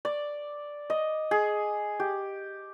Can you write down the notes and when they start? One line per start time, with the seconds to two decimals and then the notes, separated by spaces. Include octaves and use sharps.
0.05 D5
0.90 D#5
1.31 G#4
2.00 G4